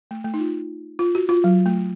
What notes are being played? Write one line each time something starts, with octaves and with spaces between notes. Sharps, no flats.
A3
A3
D#4
F4
F4
F#4
F4
F#3
A3